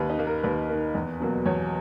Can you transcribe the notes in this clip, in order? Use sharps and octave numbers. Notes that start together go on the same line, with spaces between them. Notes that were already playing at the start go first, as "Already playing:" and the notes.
Already playing: D#2 B4
D#4
D#3 A#3
A#4
D#2 B4
D#3 A#3
E2
B2 F#3 A#3
E2 C#5